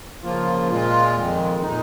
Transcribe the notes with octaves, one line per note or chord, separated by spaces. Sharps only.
C#3 F3 A#3 F4
A#2 G#3 F4
F2 D#3 G#3
A#2 G#3 D#4